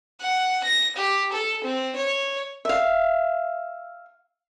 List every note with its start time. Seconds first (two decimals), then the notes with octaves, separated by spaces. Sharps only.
0.21 F#5
0.64 A#6
0.96 G4
1.33 A4
1.64 C4
1.96 C#5
2.65 E5 F5